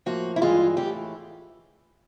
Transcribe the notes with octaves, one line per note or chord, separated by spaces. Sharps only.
A2 F3 A#3 F#4
E4
G2 E3 G#3 F4
A2 E3 A3 G4